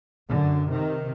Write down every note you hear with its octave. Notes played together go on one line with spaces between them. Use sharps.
F#2 D3
C3 D#3